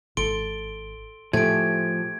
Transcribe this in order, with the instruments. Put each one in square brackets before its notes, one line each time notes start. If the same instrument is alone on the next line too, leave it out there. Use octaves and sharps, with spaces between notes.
[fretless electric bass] G#1 [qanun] A4 [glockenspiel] C6 D7 G7
[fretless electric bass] A2 [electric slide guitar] F3 [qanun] A3 G4 G#4 [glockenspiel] G#6 D7